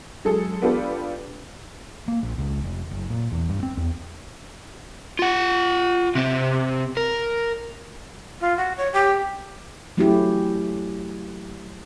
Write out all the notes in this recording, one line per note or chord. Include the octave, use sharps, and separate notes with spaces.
F#3 G#3 G#4 A4
B3 D4 F4 G4 A4 B4
A#3
A#1
C#2
F1
F#1
A#2
E2
G2
C4
E2
F4 F#5
C3 C4
A#4
F4
F#4
C#5
G4
F#3 A3 C#4 E4 F#4 G4